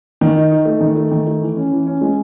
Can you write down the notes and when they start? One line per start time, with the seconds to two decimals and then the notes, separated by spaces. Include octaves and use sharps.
0.21 D#3
0.36 D#4
0.51 D#4
0.65 A3
0.80 D#3
0.96 A3
1.11 D#3
1.26 A3
1.41 E3
1.56 C#4
1.72 E3
1.87 C#4
2.01 G#3